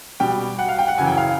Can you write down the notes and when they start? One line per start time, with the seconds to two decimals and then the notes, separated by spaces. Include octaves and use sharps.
0.20 B2 G3 G5
0.59 F#5
0.68 F5
0.79 G5
0.88 F#5
0.97 F#2 C#3 E3 G#5
1.07 G5
1.17 F5